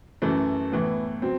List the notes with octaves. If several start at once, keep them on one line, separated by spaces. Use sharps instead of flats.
F#2 E3 A3
A2 E3 B3
F#3 C4